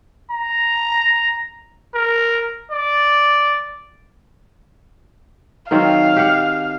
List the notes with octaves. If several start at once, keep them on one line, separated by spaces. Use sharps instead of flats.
A#5
A#4
D5
D#3 F#3 C4 F5
G4 F#5